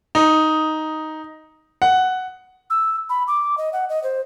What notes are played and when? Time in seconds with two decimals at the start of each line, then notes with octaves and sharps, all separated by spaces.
0.15 D#4
1.82 F#5
2.70 E6
3.10 B5
3.27 D6
3.58 D#5
3.73 F#5
3.89 D#5
4.04 C5